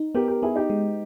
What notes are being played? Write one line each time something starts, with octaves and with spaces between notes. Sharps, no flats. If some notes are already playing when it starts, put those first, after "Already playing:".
Already playing: D#4
B3 G4 A#4
G4 A#4
B3 E4 G#4
D#4 G4
G#3